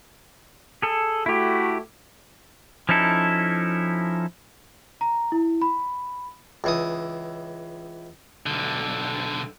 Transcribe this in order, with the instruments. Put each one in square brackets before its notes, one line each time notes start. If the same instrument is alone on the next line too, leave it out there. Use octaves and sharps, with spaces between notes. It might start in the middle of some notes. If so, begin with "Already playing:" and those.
[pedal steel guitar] G#4 A4
[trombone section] A3 F#4 [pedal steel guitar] E4 G4
[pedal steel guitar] F3 C#4 D#4 E4 A4
[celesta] A#5
E4
B5
[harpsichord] C#2 E3 D#6
[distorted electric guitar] B1 D3